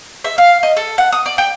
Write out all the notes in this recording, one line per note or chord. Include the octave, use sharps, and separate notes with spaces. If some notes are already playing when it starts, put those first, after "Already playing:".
E5
F5
D#5
A4
F#5
D#6
D5
G5